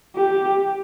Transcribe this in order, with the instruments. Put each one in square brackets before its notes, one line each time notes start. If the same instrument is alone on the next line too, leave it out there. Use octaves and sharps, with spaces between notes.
[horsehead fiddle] G4